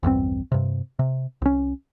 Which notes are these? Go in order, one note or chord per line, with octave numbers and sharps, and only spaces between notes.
A#1 E2 G2 C4
G2 C3
C3
C2 C#4